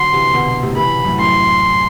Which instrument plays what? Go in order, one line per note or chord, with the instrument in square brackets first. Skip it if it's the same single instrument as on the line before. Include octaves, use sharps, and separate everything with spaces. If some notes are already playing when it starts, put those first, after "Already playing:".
Already playing: [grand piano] D3 F#3 [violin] C6
[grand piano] C3 E3
B2 D3
A2 C3
[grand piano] C3 E3 [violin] B5
[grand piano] F#2 A2
[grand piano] F#2 A2 [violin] C6